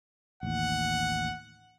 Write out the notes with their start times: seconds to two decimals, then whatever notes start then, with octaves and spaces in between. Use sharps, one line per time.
0.43 A1 D#2 F#5